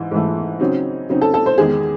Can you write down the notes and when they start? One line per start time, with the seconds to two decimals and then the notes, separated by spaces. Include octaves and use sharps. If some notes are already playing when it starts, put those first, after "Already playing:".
Already playing: G#2 E3
0.11 G#2 E3 A3
0.60 C#3 F#3 C4 D#4
1.10 C#3 F#3 C4 D#4
1.22 A4
1.34 A4
1.46 C5
1.58 E2 D#3 G#3 D#4 G#4